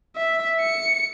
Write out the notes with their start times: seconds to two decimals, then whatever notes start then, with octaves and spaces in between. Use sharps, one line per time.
0.16 E5
0.60 C#7